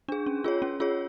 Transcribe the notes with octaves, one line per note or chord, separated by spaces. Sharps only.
D4 G#4
C#4
F4 G#4 C#5
C#4
F4 G#4 C#5